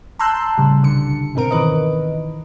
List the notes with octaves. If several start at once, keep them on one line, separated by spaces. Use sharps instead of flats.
A5 A#5 C6 E6 F#6 G6
A2 C#3 G3
C2 D3 C#7
G#2 B2 C4 A#4 D7
D#3 E3 B4 D#5